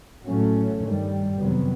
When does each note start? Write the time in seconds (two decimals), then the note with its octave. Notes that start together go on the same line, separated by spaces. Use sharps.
0.27 A2 F#3 A3 C#4
0.82 G2 D#3 G3
1.39 F2 C3 D#3 F#3 B3